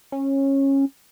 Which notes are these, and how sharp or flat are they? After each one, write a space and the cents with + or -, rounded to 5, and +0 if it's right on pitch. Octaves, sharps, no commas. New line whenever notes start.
C#4 -20